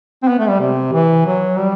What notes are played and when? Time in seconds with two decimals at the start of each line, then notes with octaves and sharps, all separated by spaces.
0.23 C4
0.28 B3
0.39 A3
0.49 G3
0.60 C3
0.93 E3
1.26 F#3
1.58 G3